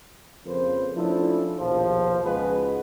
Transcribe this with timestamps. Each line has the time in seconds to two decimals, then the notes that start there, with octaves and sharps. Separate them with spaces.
0.46 F2 C#3 F3 A#3 B4 C5
0.96 F3 A3 C#4 D4 E4
1.58 A#1 D#2 B2 F3
2.24 C#2 D#4 F#4 G#4 B4